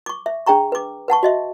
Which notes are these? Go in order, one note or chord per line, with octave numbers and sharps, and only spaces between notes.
C#6 D6
E5
D4 G#4 G5 A#5 C#6
B4 D6
B4 F#5 A5 C#6
F#4 D#5 E5